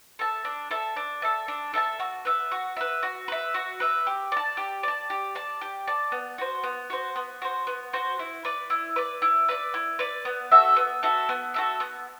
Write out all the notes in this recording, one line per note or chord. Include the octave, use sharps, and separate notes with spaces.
A4 E5 A5
D4
A4 E5 A5
D4
A4 E5 A5
D4
A4 E5 A5
F#4
B4 E5
F#4
B4 E5
F#4
B4 E5
F#4
B4 E5
G4
D5 A5
G4
D5 A5
G4
D5 A5
G4
D5 A5
B3
F#4 C5
B3
F#4 C5
B3
F#4 C5
B3
F#4 C5
E4
B4 D5
E4
B4 D5
E4
B4 D5
E4
B4 D5
B3
F#4 A4 E5
B3
F#4 A4 E5
B3
F#4 A4 E5
B3